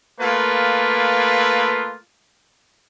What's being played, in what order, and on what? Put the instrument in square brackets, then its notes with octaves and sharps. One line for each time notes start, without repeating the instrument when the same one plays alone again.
[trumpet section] A3 A#3 F4 B4